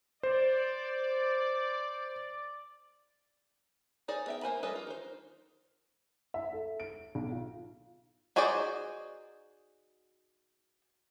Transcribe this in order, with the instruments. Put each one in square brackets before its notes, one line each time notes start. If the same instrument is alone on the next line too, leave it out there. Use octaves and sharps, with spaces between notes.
[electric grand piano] C5 [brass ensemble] D5
[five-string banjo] D#4 G#4 C5 D5
B3 E5 G5
A#3 C5 G#5 B5
G3 G#4 A4 B4 D#5
F4
D#3 C5
[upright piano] E5
A4
D7
B1
F4
[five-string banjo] D#4 F#4 G#4 C5 D5